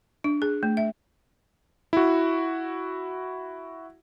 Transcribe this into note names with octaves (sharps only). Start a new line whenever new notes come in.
D4
G#4
A3
E5
E4 F#4